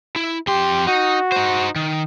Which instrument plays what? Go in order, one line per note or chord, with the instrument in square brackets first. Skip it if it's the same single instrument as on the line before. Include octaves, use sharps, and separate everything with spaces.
[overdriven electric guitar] E4
[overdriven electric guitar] F2 C6 [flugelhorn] G4
[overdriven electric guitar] D#4 [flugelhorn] F#4
[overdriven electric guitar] D#4 C5
D#3